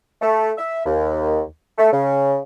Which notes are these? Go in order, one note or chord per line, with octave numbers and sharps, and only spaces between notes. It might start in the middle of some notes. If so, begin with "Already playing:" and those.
A3
E5
D#2
A3
C#3